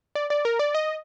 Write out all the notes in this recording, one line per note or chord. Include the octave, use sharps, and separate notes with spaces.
D5
D5
A#4
D5
D#5